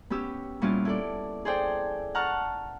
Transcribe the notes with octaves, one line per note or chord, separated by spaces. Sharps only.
B3 C#4 G4 E6
A#2 G3 B3 C#4 E4 F4
E4 A4 D5
G#4 A4 C5 D5 G5
F#5 A5 A#5 C#6 F6